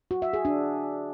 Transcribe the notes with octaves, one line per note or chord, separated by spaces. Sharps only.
F#4
E5
G#4
D4